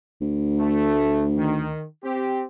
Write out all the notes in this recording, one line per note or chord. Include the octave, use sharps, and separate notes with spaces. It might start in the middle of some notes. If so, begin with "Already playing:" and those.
D2
A3
D#3
C4 G4